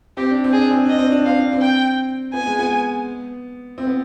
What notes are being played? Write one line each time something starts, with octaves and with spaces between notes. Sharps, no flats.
C4 G4
D4
C4
D4 G#4
C4
D4 D#5
C4
D4
C4 F5
D4
C4
G5
B3 G#5
G#3
B3
C4
B3